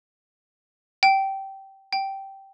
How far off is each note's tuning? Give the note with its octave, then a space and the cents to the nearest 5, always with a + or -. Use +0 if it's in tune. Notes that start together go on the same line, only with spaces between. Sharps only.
G5 -15
G5 -10